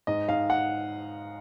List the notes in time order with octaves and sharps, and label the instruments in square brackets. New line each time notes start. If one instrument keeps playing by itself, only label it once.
[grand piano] G#2 D#5
G#2 F5
F#5